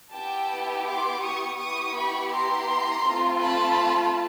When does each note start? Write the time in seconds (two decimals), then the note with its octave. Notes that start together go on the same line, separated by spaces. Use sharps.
0.12 B3 E4 G4 G5 A5
0.86 C6 D6
1.22 C#6 D#6
1.58 B3 E4 G4 C#6 D#6
1.95 B5 C#6
2.31 A#5 C6
3.06 A3 C4 F4
3.41 A5 B5